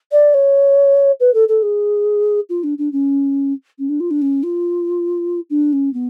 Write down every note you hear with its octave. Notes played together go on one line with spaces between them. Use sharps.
D5
C#5
B4
A4
A4
G#4
F4
D4
D4
C#4
C#4
D4
F4
D4
C#4
F4
D4
C#4
B3